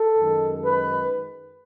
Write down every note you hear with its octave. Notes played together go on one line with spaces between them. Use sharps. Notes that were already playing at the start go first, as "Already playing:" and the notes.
Already playing: A4
F#2 D#3 G#3
B4